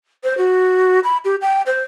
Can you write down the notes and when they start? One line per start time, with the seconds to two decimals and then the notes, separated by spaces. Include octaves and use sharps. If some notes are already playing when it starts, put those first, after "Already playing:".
0.24 C5
0.38 F#4
1.04 B5
1.25 G4
1.42 G5
1.66 C5